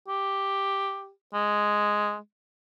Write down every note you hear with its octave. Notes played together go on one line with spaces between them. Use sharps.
G4
G#3